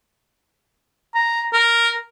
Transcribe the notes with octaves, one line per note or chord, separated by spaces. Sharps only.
A#5
A#4